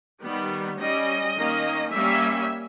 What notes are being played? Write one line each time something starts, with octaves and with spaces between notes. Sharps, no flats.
D#3 G3 B3
G3 C#4 D#5
D#3 A#3 C#4
G3 A#3 C#4 E5